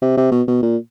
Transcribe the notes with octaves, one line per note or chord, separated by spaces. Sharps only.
C3
C3
B2
B2
A#2